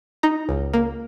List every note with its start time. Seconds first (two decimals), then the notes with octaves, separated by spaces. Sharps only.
0.23 D#4 A#5
0.49 C#2
0.74 A#3